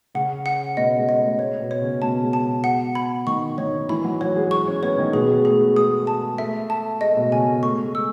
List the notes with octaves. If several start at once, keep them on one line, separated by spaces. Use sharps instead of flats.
C#3 C#4 F#5
F#5
B2 B3 D#5
G#3
D#5
A3
A3 C#5
B2 B3
C#5
C#3 C#4
B2 B3 A5
G#3
A5
B2 B3
F#5
B5
D#3 D#4 C#6
D#3 D#4 C#5
E3 E4 B5
F#3 F#4
F#3 F#4 C#5
G#3 G#4
C#6
C#4 C#5
B3 B4 C#5
D#3 D#4
B2 B3 G#4
G#3
A3 G#4
G#3 D#6
A5
A3 E5
A5
G#3 D#5
A3
B2 B3
C#3 C#4 G#5
G#3
A3 C#6
G#3
E6